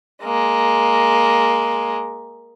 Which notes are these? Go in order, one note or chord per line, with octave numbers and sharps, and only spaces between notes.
G#3 A#3